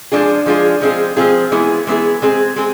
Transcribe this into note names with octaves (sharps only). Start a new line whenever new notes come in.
F3 G#3 D4 F4 G#4
F3 G#3 D4 F4 G#4
F3 G#3 C4 F4 G#4
F3 G#3 C4 F4 G#4
E3 G#3 B3 E4 G#4
E3 G#3 B3 E4 G#4
G#3 C4 G#4
G#3 C4 G#4